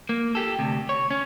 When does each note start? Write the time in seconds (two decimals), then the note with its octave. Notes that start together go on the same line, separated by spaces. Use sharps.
0.09 A#3
0.35 G4 A4
0.59 D2 C3
0.89 C#5
1.11 C#4